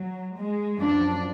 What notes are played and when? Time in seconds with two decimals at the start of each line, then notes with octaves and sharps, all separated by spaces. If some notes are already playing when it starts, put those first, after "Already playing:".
Already playing: F#3
0.37 G#3
0.79 F#2 F3 D4